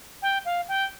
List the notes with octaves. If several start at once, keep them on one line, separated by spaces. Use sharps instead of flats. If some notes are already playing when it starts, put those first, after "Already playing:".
G5
F5
G5